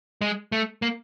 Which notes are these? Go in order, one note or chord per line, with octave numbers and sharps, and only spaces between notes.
G#3
A3
A#3